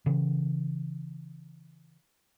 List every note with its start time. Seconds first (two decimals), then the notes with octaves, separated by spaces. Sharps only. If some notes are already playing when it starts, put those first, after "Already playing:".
0.06 C#3 E3